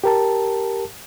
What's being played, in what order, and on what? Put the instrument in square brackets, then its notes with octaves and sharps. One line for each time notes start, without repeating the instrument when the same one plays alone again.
[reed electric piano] G4 A#4 A5